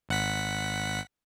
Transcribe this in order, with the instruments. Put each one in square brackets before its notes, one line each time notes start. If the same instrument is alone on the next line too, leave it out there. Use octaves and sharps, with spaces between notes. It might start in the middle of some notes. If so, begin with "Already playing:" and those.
[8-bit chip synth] G#1 F#5 B6